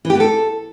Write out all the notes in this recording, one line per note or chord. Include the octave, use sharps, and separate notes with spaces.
E3
G4
B3
A4